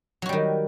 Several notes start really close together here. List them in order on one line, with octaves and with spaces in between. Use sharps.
F#3 F#4 G3 D#3